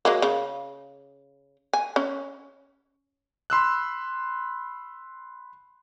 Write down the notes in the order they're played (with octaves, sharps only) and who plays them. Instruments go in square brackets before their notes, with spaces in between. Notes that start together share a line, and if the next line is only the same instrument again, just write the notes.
[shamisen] F#3 G#3 A#3
C#3
G#5
C#4
[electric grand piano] B5 C6 E6 F#6